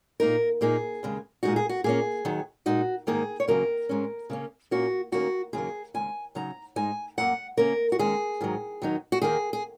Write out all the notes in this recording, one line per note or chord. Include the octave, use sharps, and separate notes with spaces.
A#2 A#3 D#4 A#4
A#2 A#3 D#4 G#4
D#2 C#3 G#3
A#2 G#3 D#4 F#4
G#4
F#4
A#2 A#3 C#4 G#4
D#2 D#3 F#3
A#2 G#3 D#4 F#4
G#2 D#3 A#3 D#4 G#4
C#5
D#2 C#3 F#3 A#3 A#4
G#2 G#3 C#4
C#3 A#3 C#4
A#2 A#3 C#4 F#4
D#2 D#3 A#3 C#4 F#4
D#2 C#3 F#3 A#3 G#4
D#2 C#3 G#3 G#5
C#3 F#3 D#4 A#5
G#2 G#3 D#4 G#5
F#2 F#3 A#3 F#5
C#3 A#3 C#4 A#4
F#4
D#2 D#3 G#3 C#4 G#4
G#2 D#3 F#3
D#2 D#3 F#3 D#4
F#4
D#2 D#3 A#3 D#4 G#4
G#4